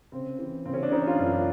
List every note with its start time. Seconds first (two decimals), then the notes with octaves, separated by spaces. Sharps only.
0.12 C#3 C4
0.39 E3
0.66 C#3 C4
0.74 C#4
0.83 D4
0.92 E3 C#4 D#4
1.07 F4
1.18 F#2 D4 E4
1.33 D4